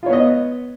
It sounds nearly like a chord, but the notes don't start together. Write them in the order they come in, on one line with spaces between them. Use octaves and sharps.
F4 C#5 B3 D#5